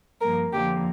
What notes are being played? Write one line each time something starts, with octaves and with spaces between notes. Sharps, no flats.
G2 F3 A#3 A#4
F2 D3 F3 A#3 G4